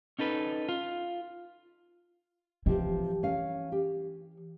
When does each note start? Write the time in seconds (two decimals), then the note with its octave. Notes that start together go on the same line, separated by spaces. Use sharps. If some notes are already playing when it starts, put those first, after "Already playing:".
0.19 C#4 D#4 A4 B4
0.69 F4
2.66 C3 E3 F3 G4
3.23 C#4 F5
3.72 G4